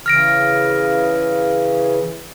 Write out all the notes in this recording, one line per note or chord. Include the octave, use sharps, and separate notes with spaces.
C#3 E3 F6 A#6 D7